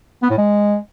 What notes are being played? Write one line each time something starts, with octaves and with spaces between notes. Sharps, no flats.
B3
A2
G#3